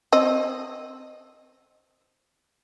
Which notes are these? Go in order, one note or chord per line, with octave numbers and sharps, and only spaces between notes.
C4 D#5